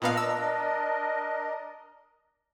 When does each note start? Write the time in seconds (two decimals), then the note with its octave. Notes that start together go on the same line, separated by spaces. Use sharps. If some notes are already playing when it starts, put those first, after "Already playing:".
0.02 A#2 B3 D4 A#4 D#5 F5
0.17 E6